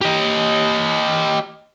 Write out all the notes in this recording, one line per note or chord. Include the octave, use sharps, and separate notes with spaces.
G4 D#5